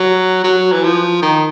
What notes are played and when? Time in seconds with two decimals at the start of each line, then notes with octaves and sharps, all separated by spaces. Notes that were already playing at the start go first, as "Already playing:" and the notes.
Already playing: F#3
0.44 F#3
0.73 E3
0.84 F3
1.22 D#3